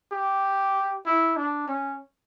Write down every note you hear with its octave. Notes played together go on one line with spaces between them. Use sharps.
G4
E4
D4
C#4